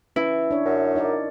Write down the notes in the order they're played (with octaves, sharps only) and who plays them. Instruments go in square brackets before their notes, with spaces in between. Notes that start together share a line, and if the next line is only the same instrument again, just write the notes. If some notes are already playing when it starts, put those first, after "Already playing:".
[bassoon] E3 [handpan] C#4 [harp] E4
[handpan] D4 C#5
[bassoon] F#2
[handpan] D#4 A#4 D5